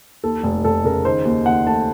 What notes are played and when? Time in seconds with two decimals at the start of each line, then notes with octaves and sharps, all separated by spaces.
0.24 D#2 A4
0.44 F1
0.64 F1 A4
0.84 C#3 A#4
1.05 D#3 C5
1.25 D#2
1.46 D#2 F#5
1.67 A3 A5